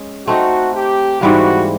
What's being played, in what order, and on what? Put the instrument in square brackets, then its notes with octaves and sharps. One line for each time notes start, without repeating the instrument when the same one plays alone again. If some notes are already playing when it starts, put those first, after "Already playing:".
Already playing: [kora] G#3 C#4
[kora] A3 C4 D#4 [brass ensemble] F#4
[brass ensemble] G4
[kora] G#2 E3 G3 A#3 [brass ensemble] F#4